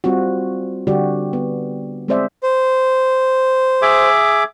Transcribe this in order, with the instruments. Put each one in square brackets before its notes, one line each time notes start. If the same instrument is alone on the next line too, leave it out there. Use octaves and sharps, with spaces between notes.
[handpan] G3 C4 F4 F#4
D3 G3 F#4 G4 D5
B3
G#3 C4 G#4 C5 D5 E5
[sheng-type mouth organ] C5
[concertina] G#4 E5 D6